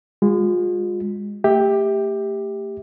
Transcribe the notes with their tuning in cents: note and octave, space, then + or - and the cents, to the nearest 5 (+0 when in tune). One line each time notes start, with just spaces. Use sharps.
G#3 -30 F4 +35
A3 +35 G4 +10 E5 -25